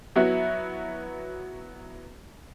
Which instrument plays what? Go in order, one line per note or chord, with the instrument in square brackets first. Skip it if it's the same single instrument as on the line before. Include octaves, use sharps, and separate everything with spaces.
[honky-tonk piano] F#3 B3 E4 F#4